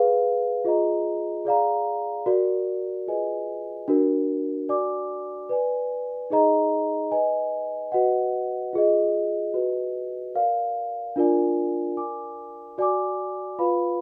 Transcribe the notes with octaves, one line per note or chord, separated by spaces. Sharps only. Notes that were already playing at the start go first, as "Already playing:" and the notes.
Already playing: G#4 B4 F5
F4 G#4 D#5 A#5
G#4 D5 F5 A#5
F#4 A#4 D5
F4 G#4 B4 D#5 G#5
D4 F#4 A#4
F#4 D5 G#5 D6
B4 D5 G#5
D#4 G#4 D#5 A#5
B4 D#5 G#5
F#4 B4 D#5 F#5
F4 G#4 D#5
F#4 B4 D#5
A#4 D5 F5
D4 F4 A#4 D5 G#5
A#4 D5 G#5 D6
F#4 D5 G#5 D6
F4 B4 F5 B5